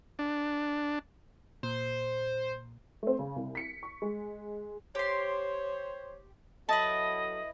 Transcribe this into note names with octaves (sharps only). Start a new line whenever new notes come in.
D4
A#2 C5
A3 C4
C#3
C2
B6 C#7
C#6
G#3
G4 C5 C#5 C6
F#3 E4 A4 B4 D#5 A5